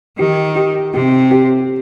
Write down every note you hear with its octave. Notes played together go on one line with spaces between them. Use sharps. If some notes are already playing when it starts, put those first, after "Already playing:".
D#3 G4
G4
C3 G4
G4